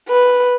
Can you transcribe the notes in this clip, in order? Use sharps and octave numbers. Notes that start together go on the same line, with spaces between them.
B4